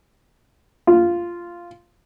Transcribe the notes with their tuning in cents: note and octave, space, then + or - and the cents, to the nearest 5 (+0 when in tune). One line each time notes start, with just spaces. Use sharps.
F4 -10